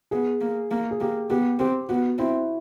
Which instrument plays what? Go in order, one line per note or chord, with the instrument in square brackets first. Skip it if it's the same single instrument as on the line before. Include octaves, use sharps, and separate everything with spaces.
[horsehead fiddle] B3 [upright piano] G#4
[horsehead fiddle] A#3
A#3
[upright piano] G#4
[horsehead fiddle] A#3 [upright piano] G4
[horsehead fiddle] B3 [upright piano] G4
[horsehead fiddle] C4 [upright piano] G4
[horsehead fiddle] B3 [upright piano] F#4
[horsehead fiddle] C4 [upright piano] E4